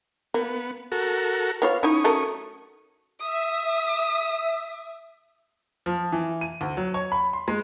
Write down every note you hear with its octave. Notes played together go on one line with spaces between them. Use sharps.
A#3 B3
F#4 A4 A#4
B3 F4 C#5 F5
C#4 D#4 E4 C#6 D#6
F#3 A3 A#4
E5 D#6
F3
E3
D#7
D2
F#3
C#5
B5
C6
G#3